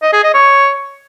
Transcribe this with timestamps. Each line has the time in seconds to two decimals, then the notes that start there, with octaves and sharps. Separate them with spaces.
0.02 D#5
0.13 G#4
0.24 D#5
0.34 C#5